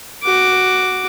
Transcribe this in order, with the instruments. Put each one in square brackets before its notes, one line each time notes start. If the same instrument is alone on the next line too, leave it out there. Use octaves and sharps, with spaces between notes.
[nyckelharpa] F#4 D6